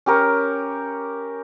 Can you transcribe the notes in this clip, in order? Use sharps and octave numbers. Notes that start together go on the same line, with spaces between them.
C#4 G4 A#4 C#5